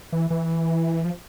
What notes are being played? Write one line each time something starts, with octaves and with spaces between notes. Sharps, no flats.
E3
E3
F3